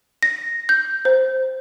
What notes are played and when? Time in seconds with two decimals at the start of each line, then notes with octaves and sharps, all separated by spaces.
0.23 A#6
0.69 G6
1.05 C5